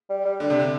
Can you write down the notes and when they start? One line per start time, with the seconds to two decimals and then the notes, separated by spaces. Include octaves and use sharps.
0.09 G3
0.25 G3
0.40 D3 G3
0.50 C3
0.60 D3